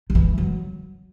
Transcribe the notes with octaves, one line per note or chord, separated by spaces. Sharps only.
D#3
E3
F#3